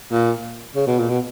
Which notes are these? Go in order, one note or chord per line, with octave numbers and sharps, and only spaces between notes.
A#2
C#3
B2
A#2
B2